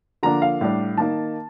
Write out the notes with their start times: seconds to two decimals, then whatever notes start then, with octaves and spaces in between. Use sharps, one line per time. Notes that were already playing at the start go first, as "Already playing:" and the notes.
0.23 D3 F3 A#3 D4 A#5
0.42 F5
0.61 A2 G3 D4
0.98 D#3 A#3 D#4 A5